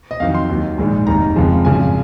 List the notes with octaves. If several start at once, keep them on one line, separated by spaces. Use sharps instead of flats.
D#5
F2 D#3 F#3 F5
C6
D#2 D#3 F#3
A#1 G#2 D#3 G#3
F1 D#2 D#3 A#5
F1 F2 C#3 F3 G#3
G#1 F#2 C#3 F3 G#5